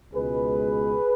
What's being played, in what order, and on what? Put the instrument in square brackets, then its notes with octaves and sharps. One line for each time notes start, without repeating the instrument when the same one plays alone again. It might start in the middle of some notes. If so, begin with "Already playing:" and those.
[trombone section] C#2 B2 G#3 G#4 B4